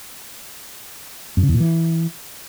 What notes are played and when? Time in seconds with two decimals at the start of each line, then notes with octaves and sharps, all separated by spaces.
1.37 F#2
1.43 C#3
1.49 E2
1.54 A#2
1.60 E3